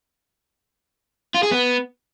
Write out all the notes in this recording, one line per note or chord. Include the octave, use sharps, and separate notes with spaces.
F4
G#4
B3